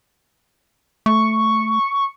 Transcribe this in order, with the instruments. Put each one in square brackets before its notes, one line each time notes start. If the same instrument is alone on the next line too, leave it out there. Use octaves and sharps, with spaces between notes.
[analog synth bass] A3 [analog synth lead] C#6